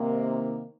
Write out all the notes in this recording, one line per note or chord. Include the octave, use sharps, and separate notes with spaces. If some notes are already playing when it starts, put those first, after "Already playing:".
Already playing: C3 D#3 A#3